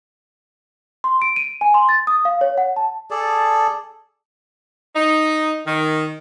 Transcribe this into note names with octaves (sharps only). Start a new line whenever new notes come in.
C6
D7
D#7
G#5
C6
A6
D#6
F5
C#5
F#5
A5
G#4 A4 D5 A5
D#4
D#3